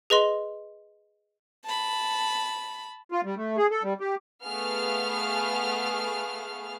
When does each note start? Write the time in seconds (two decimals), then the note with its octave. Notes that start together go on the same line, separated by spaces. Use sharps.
0.10 G#4 B4 D#5 C6
1.65 A5 B5
3.12 F4
3.24 G3
3.37 A3
3.57 G#4
3.71 A4
3.83 G3
4.00 G4
4.44 A3 B3 G#4 F5 F6